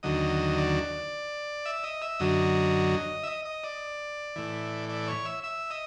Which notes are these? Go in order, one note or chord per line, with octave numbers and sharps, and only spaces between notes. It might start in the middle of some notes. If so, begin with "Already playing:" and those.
D#2 D3 F#3 D#5
D5
E5
D#5
E5
F#2 D3 F#3 D#5
E5
D#5
D#5
D5
A2 E3
D5
C#5
E5
E5
D#5